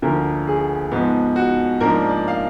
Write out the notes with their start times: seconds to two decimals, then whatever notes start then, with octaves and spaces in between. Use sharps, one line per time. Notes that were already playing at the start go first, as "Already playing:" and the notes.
0.02 D2 D3 F3 A#3 A#4
0.47 G#4
0.92 G#2 F3 B3
1.36 F#4
1.80 G#2 F3 A#3 D4 A#4
2.09 D5
2.28 F5